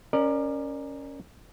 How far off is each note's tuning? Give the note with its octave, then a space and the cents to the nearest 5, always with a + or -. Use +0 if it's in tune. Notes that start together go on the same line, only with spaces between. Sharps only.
C#4 +0 A#4 +0 D5 +30